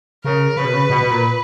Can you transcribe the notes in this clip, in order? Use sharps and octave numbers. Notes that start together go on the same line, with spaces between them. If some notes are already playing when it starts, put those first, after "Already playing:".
C#3 A#4
C#3 B4
B2
C#3
B2
B2
A#2